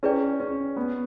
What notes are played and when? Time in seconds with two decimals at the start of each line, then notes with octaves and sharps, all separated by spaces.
0.03 C#4 E4 G#4 B4 D5 G5
0.40 C#4
0.76 B3